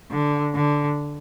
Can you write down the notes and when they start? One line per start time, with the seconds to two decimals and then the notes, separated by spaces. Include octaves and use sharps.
0.11 D3
0.54 D3